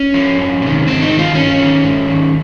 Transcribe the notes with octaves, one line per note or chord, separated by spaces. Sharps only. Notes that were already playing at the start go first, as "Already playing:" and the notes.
Already playing: C#4
F3
F2
C3 D#3
G#2 C4
D#4
D#3
F4
G2 C#4
D#3
G#2
D#3